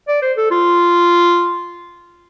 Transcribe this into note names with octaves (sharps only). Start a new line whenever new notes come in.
D5
C5
A4
F4